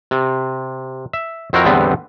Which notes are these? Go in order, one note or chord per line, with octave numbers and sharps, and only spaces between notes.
C3
E5
F2 C4 E4 F#4 A#4
E2 A2 D3 G3 B3 C4